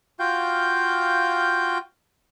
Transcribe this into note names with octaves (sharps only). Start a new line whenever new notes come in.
F4 F#4 F5 G5 G6